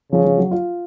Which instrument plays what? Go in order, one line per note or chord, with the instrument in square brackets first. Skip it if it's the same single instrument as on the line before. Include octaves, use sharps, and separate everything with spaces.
[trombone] C#3 [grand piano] F3
[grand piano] F3
F#3
F4